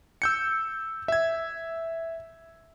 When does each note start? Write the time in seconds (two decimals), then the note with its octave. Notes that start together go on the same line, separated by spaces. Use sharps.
0.22 E6 G6 C#7
1.08 E5 G#6